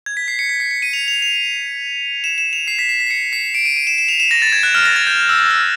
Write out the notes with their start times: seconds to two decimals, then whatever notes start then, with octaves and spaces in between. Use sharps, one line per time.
0.06 G#6
0.17 B6
0.28 C7
0.39 C#7
0.49 B6
0.60 C7
0.71 C#7
0.82 D#7
0.93 F7
1.08 F7
1.22 F7
2.24 E7
2.38 E7
2.53 F7
2.68 C7
2.79 B6
2.89 C7
3.00 B6
3.06 C7
3.10 C#7
3.33 C7
3.54 D7
3.65 D#7
3.76 D#7
3.87 E7
3.98 E7
4.09 F7
4.20 E7
4.31 A#6
4.42 A6
4.52 G#6
4.63 F#6
4.75 F6
4.85 A#6
4.96 A6
5.07 G6
5.29 E6
5.40 E6
5.51 F6